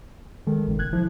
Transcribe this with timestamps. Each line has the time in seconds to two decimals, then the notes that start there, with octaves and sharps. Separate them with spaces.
0.47 D#3 G#3 A4
0.67 A1 C3 D#3
0.79 G1 F#6 G#6
0.93 F3 E4